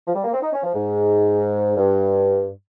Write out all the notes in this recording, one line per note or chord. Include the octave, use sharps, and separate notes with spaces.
F3
G3
A#3
C4
D#4
C#4
F3
G#2
G2